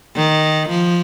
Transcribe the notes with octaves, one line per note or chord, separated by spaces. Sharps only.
D#3
F3